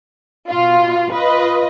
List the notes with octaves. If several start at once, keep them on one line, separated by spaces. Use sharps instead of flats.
B2 F4
F4 B4 D#5